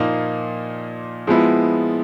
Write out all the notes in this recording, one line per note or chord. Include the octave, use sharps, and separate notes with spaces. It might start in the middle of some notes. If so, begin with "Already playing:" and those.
Already playing: A#2 F3 A#3 D#4
F3 G#3 B3 E4